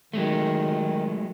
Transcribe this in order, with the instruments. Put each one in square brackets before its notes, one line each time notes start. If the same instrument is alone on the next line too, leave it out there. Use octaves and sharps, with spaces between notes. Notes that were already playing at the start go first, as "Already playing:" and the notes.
[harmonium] D#3 [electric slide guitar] F#3 G#3 A3